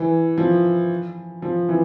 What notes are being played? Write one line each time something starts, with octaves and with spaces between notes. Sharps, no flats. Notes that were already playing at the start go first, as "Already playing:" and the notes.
Already playing: E3
F3
F3
E3